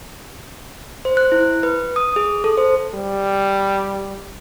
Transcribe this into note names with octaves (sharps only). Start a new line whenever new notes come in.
C5
F#6
E4
B4
D#6
G#4
A4
C5
G3